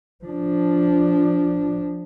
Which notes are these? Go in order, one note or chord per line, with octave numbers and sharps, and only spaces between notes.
F3 D4